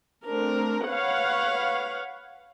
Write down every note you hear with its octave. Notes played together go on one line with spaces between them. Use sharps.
A3 C4 D4 A#4
B4 C#5 F5 F#5